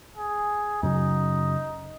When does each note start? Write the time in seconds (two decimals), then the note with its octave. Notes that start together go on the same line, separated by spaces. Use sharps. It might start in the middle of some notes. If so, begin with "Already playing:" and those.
0.17 G#4
0.83 F#2 C#3 F#3 D#4